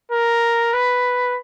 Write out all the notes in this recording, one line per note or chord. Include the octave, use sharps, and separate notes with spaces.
A#4
B4